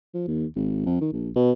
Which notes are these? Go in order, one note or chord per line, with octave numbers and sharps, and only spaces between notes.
F3
D#2
G#1
F2
D#3
A#1
B2